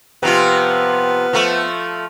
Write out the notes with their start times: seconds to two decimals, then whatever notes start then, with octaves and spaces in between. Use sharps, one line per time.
0.23 C3 F3 B3 F4
1.33 F3 A3